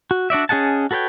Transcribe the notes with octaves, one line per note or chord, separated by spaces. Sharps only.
F#4
D4 F#4 D5 E5
C#4 G#4 D#5 F#5 A5
F#4 A4 B4 C#5 G5